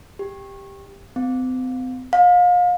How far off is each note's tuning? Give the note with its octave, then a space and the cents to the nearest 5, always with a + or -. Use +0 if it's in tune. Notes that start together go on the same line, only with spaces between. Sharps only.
G4 +10
C4 -40
F5 +35